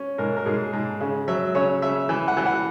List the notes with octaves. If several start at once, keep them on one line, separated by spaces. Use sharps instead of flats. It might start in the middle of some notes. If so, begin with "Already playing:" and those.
Already playing: C#4
G#2 A#4
A#4
G#2 G#4
G#2
C#3
F#3 E5
C#3 C#5
C#3 E5
E3 E5
F#5
E3
F#5